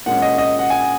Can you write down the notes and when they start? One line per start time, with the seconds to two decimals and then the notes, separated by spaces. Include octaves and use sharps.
0.06 A#2 G#3 C#4 F#5
0.22 D#5
0.38 D#5
0.59 F#5
0.70 G#5